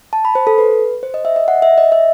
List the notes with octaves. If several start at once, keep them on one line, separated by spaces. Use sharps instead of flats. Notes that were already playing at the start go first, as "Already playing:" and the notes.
A5
B5
C5
A4
B4
C5
D#5
E5
D#5
F#5
E5
D#5
E5